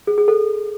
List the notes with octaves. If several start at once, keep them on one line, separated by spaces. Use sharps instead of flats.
G#4
G#4
A4